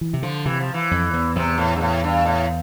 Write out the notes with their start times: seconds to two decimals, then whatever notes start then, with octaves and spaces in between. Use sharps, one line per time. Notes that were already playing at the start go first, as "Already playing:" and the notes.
0.01 E3
0.13 C3
0.23 D3 F3
0.45 C3 E3
0.60 F3
0.74 E3
0.91 F2
1.13 E2
1.36 E2 C3
1.58 A2
1.76 G2
1.81 A2
2.04 G2
2.26 A2